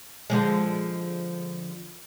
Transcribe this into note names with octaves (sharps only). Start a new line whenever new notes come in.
D3 F3 G#3